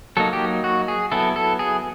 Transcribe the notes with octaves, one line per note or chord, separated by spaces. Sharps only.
F#3 A#3 D#4 A4
G4
F#4
G#4
F#3 B3 E4 A4
A4
G#4